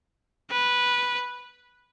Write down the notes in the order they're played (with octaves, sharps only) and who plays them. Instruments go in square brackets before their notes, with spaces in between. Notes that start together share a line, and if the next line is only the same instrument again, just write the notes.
[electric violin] B4